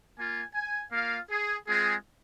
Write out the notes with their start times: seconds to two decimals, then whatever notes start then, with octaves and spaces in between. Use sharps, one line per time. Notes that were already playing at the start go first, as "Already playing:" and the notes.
0.16 A#3 F4 G#5
0.55 G#5
0.92 A#3 F4 F5
1.30 G#4
1.68 G#3 C4 F4 G#4